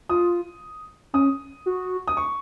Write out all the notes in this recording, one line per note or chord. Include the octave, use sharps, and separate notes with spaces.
F4 D#6
C#4 D#6
F#4
D#6
C#6